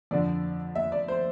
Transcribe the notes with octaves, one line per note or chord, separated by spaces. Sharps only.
F2 D3 D5
E5
D5
C5